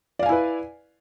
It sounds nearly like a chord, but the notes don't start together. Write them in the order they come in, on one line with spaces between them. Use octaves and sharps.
D5 F5 G#5 E4 B4